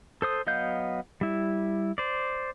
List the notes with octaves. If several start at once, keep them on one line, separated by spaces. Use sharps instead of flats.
A4 C5 D#6
F#3 B3 D#5 F5 G6
G3 E4
C5 D5